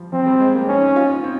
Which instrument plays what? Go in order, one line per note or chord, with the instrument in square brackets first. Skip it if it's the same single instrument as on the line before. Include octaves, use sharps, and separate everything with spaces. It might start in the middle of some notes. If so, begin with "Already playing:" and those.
Already playing: [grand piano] F3 G3
[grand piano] F3 [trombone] C4
[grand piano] G3
G#3
A#3
[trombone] C#4 [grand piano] D#4
[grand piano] D#4
F4
D#4
C4